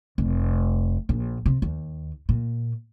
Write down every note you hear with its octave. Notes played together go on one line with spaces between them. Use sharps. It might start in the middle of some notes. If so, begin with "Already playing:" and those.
F1
A#1
C3
D#2
A#2